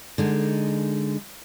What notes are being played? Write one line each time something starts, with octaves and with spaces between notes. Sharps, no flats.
D3 G#3 D#4